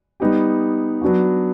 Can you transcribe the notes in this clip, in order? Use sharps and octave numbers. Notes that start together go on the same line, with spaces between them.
G3 B3 D#4 G4
F#3 B3 D4 F#4